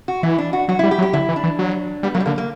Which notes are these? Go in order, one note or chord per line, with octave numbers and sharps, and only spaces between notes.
F#4
E3 E4
D4
F#4
F#3 F#4
G3 E4
G4
F#3
G4
D3 E4
E3
D4
E3
F#3
G3 B3
F#3 A#3
G3
D3 A#3
A#3